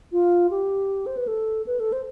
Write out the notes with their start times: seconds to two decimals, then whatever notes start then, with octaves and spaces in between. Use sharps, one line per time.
0.12 F4
0.51 G4
1.06 C5
1.17 B4
1.27 A4
1.67 B4
1.80 A4
1.93 C5